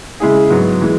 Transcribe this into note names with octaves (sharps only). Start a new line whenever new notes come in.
C#3 G#3 E4 G#4
G#2 F#3 B3
E3 G#3